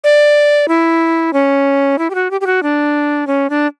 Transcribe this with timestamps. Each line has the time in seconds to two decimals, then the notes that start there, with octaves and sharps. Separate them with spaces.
0.04 D5
0.68 E4
1.33 C#4
1.99 E4
2.10 G4
2.15 F#4
2.31 G4
2.41 G4
2.46 F#4
2.63 D4
3.27 C#4
3.50 D4